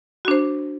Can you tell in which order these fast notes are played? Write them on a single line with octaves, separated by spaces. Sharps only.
F#4 D4 C5